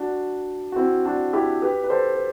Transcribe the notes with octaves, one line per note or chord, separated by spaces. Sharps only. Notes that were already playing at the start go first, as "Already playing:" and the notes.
Already playing: D4 F#4
F#4
C4 E4
D4 F#4
E4 G4
G4 B4
B4
A4 C5
B4